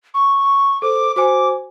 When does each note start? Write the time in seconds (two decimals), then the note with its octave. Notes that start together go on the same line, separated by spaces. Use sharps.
0.14 C#6
0.82 A4 C5 D6
1.16 F#4 C5 G#5 D6